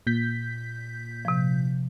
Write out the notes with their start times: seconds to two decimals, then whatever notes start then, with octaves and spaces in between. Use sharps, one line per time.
0.07 A#2 G6 B6
1.25 C3 F3